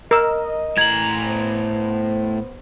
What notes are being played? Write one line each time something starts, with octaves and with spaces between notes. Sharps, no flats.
A#4 D#5 E6
A2 A#5 G#6 F#7
B3 C5